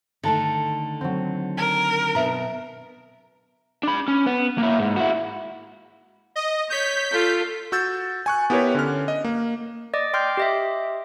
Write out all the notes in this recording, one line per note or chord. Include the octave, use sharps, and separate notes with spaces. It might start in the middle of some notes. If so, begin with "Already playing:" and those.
D3 D#3 A3 A5 A6
F#3 C4
A#4
B2 E5 A#5
D4 B5
C#4
B3
A#3 E4
G#2
E4 F#4
D#5
C#5 G6 B6
F4 A4
F#4 E6 G6 A6
G#5 C#6 F#6
B3 E4 G4 A#4 B4 C#5
D3 C#4 F6
D#5
A#3
D5 D#5 D6
G5 C6 D6 F6 G6
G4 D#5 E5